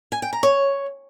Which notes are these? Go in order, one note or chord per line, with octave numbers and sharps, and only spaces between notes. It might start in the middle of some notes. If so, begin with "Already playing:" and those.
G#5
G5
A#5
C#5